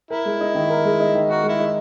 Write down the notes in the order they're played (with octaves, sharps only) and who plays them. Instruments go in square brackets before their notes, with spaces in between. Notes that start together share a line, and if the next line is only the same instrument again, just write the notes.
[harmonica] E4 [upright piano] A#4
[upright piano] G#3
D#4
D#3
A#4
G#3
D#4
D#3
[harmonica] F#4 [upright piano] A#4
[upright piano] G#3
[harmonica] E4
[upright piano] D#4